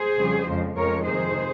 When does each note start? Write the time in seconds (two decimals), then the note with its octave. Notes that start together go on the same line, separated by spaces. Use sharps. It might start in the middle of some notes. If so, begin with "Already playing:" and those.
Already playing: G#4 C5
0.17 F2 C#3 G3
0.46 F2 C#3 F3 G#3
0.76 F2 C#3 F3 G#3 A#4 C#5
1.06 F2 C3 D#3 G#4 C5